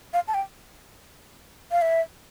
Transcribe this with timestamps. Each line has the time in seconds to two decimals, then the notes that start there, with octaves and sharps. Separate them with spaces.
0.14 F5
0.28 A5
0.34 G5
1.71 F5
1.82 E5